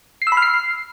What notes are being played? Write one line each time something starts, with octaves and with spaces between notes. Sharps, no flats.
C7
E6
B5
F6
C7